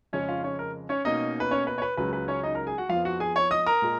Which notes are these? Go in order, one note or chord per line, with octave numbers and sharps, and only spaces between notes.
F2 C#3 G#3 C#4 C#5
F4 F5
C#4 C#5
A#4
C#4 C#5
B2 A#3 C#4 D#4 D#5
B4
C#4 C#5
B4
C#5
B4
C#2 C#3 F#3 B4
B4
C#4 C#5
D#4 D#5
A#4 A#5
G#4 G#5
F#4 F#5
F2 F3 B3 F4 F5
F#4 F#5
G#4 G#5
C#5 C#6
D#5 D#6
A#4 A#5
A#2 G#3